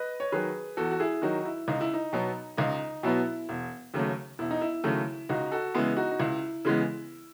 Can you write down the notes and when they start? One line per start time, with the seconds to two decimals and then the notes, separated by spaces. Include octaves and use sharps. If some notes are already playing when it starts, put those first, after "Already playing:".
Already playing: B4 D#5
0.20 C#5
0.32 D#3 F#3 G#4 B4
0.77 E2 F#4 A4
0.91 F#4
1.00 E4 G#4
1.22 D#3 F#3 D#4 F#4
1.45 E4
1.68 C#2 D#4
1.81 E4
1.94 D#4
2.13 B2 F#3 B3
2.57 C#2 D#4
3.03 B2 F#3 B3 E4
3.49 E1
3.94 D#2 C#3 F#3 A3
4.39 E1 E4
4.51 D#4
4.61 E4
4.84 D#2 C#3 F#3 A3
5.29 C#2 D#4 F#4
5.52 F#4 A4
5.75 C#3 E3 G#3 B3 E4 G#4
5.96 D#4 F#4
6.11 D#4
6.19 C#2 E4
6.65 C#3 E3 G#3 B3